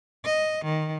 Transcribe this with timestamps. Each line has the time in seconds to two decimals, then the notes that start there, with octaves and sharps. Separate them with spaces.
0.24 D#5
0.64 D#3